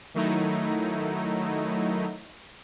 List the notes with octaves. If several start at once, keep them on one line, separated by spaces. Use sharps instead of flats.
D#3 F#3 A3 D#4 E4